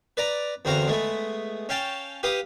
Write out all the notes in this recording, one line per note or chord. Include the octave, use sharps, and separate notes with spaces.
B4 D5 A#5
E2 D3 C4 F#4 F5 A#5
G#3 A3 B3
C#4 F5 G5 A5
G4 B4 F5 D#6